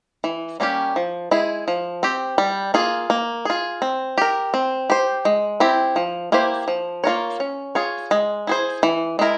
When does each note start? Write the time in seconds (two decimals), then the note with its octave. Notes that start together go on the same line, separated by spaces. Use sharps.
0.24 E3
0.60 G3 A#3 C#4 G4
0.96 F3
1.31 G#3 E4 G#4
1.68 F3
2.03 C4 G4
2.38 G3
2.74 A#3 F4 G#4
3.10 A#3
3.45 F4 G#4
3.82 C4
4.18 G4 A#4
4.54 C4
4.90 G4 C5
5.25 G#3
5.60 C4 E4 G4
5.96 F3
6.32 A#3 E4 G4 C5
6.68 F3
7.04 A#3 F4 A#4 C#5
7.40 C#4
7.75 F4 G#4 C#5
8.11 G#3
8.47 E4 G#4 C5
8.83 E3
9.19 G#3 E4 A#4